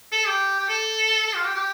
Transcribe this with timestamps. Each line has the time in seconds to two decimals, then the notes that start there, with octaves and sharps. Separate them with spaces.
0.12 A4
0.26 G4
0.59 G4
0.68 A4
1.26 A4
1.35 F4
1.45 G4
1.55 G4